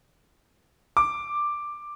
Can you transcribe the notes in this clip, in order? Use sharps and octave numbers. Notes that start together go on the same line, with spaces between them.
D6